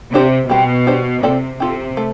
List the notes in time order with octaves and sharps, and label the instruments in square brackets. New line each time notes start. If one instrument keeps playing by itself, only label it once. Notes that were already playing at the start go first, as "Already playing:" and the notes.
[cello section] C3 [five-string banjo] D4 G4 C5
[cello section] B2 [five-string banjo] G3 C4 G4
[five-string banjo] D4 G4 C5
[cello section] C3 [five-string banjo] C4 F4 A4 D5
[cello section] C3 [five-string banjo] C4 F4 A4
[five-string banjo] A3